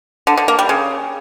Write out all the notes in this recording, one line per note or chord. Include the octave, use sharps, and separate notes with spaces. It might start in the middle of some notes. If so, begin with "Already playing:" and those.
D3
D3
A#3
G3
C#3